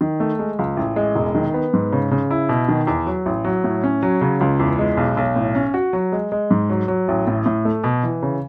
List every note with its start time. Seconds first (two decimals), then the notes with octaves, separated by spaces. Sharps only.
0.01 D#3
0.20 A3
0.39 G#3
0.59 C#2
0.77 A1
0.96 G#3
1.16 E1
1.35 D#3
1.54 B3
1.74 G#2
1.92 C#3
2.11 C#3
2.31 E4
2.49 B2
2.68 D#3
2.87 E2
3.06 F#3
3.26 A1
3.45 F#3
3.64 A2
3.83 C#4
4.03 F#3
4.21 C#3
4.41 C#2
4.60 E2
4.79 G#3
4.97 B1
5.17 B1
5.36 A2
5.55 C#4
5.74 F#4
5.93 F#3
6.12 G#3
6.32 G#3
6.51 G#2
6.70 F#3
6.88 F#3
7.08 A1
7.27 A2
7.46 A2
7.65 A3
7.84 B2
8.03 E3
8.22 C#3